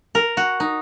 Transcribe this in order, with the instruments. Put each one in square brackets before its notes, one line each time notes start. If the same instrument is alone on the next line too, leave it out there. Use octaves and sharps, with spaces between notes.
[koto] A#4
F#4
D#4